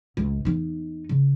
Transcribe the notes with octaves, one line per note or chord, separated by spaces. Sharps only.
C#2
E2 D#4
C#3